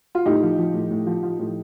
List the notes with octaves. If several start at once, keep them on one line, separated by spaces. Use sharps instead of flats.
F4
A2 D#4 G4
F3
F3
A2
A2
F3
F3
A2